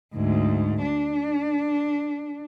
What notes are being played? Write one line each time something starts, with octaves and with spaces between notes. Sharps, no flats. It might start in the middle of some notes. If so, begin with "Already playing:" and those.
D2 G#2
D4